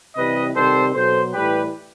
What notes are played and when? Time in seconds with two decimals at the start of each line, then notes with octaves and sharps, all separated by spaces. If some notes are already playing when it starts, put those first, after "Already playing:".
0.16 C3 E3 G3 B4 D#5
0.55 C3 D#3 G3 A4 C5
0.94 B2 F#3 A4 C5
1.34 A2 E3 G3 G4 B4